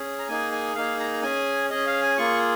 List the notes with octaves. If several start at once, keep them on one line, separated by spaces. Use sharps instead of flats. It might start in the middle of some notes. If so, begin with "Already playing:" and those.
Already playing: C#4 G#4
A#5
A#3 D#4 G#4 G#5
G#5
A#3 D#4 G#4 F5
A#5
C#4 G#4 G#5
C#4 G#4 D#5
F5
G#5
A#3 F4 G#4 C#6